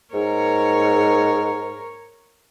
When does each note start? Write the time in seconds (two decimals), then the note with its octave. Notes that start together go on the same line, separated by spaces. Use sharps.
0.14 G#2 A#4 C#5